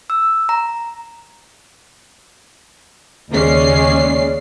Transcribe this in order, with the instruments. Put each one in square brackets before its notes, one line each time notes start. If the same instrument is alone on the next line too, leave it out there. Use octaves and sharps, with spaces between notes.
[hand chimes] E6
A#5
[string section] D#2 C#3 G#3 C#4 D5 C7